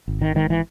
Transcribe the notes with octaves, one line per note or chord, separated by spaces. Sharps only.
G#1
D#3
G#2 D#3
E3